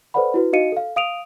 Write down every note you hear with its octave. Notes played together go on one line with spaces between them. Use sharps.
A4 B4 C5 D5 F#5 B5
E4 F#4 B4
D#4 F#4 D#5 F5 C#7 D#7
A4 F5
F5 D#6 D7 D#7 F7